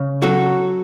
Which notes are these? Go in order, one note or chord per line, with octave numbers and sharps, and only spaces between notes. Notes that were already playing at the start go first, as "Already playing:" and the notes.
Already playing: C#3
F#3 F#4 A4